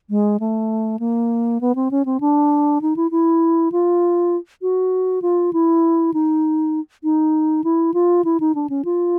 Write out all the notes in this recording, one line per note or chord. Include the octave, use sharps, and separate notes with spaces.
G#3
A3
A#3
B3
C4
C#4
C4
D4
D#4
E4
E4
F4
F#4
F4
E4
D#4
D#4
E4
F4
E4
D#4
D4
C#4
F4